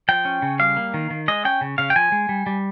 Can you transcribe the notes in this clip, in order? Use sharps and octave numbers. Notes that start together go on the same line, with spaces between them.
F3 G5
C#4
C#3
G3 F5
A#3
D#3
D#3
G#3 D#5
C#4 G5
C#3
C#3 F5
G5
F3 G#5
G#3
G3
G3